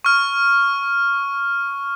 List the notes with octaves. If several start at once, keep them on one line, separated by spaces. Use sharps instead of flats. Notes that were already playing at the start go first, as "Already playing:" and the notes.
C#6 F6